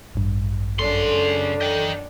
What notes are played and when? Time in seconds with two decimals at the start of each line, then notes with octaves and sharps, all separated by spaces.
0.15 A1 G2
0.79 F#2 C#3 D4 A4 C6
1.61 D#5 G5 G6